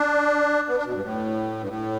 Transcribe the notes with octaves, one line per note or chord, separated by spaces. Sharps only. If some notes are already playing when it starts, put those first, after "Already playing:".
Already playing: D4
B3
D4
B2
G2
A2
G2
A2